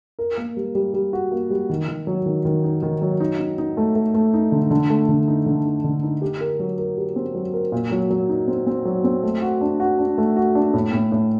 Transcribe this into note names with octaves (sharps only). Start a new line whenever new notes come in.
A#4
A#3
G3
G3
G3
F#4
A#3
G3
D#3
D#3
F#3
D#3
D#3
D#4
D#3
F#3
D#4
D#4
D#4
A3
A3
A3
D#4
D3
D3
A3
D3
D#4
D3
D#4
D3
D#4
G4
A#4
F#3
A#4
G4
C4
F#3
A#4
A#2
F#3
F#3
D#4
C4
C4
F#3
C4
A3
F#4
D4
F#4
D4
A3
F#4
D4
A2
A2
A2